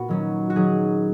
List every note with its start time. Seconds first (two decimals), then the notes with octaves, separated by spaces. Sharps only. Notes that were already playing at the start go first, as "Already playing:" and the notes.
Already playing: A#2 B3 F#4
0.09 D#3 F#3 C#4
0.50 F#4
0.56 D#3 F#3 C#4 G#4